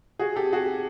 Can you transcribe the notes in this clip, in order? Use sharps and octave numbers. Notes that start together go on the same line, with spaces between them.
F#4 G#4
G4 A4
F#4 G#4